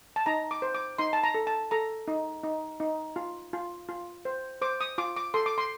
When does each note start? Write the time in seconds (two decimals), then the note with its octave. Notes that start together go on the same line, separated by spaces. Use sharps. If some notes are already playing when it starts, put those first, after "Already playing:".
0.16 A5
0.26 D#4 A#5
0.51 D6
0.62 C5
0.75 D6
0.99 D#4 C6
1.13 A5
1.24 A#5
1.34 A4
1.47 A5
1.71 A4 A#5
2.08 D#4
2.44 D#4
2.80 D#4
3.16 F4
3.53 F4
3.89 F4
4.25 C5
4.61 C5 D6
4.81 D#6
4.98 F4 D6
5.16 D6
5.34 A4 C6
5.46 D6
5.58 C6